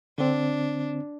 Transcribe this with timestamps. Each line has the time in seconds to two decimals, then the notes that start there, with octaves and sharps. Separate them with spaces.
0.18 D3 C4 D4